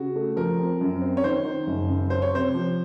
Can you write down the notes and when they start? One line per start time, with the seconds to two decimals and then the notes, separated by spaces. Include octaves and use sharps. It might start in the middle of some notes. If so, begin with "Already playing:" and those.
Already playing: C#3 F#4
0.16 A3
0.36 F3 A#4
0.59 C4
0.81 F#2
1.02 C4
1.17 C#5
1.24 D#3 C5
1.45 D#3
1.67 F#1
1.88 F#2
2.10 C#4 C5
2.22 C#5
2.33 C3 C5
2.54 F3